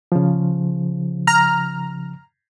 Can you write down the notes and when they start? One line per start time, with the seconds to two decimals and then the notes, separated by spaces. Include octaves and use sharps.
0.12 C#3 F3
1.27 A#5 F6